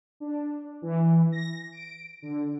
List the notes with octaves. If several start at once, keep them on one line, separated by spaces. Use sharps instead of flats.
D4
E3
A#6
D7
D3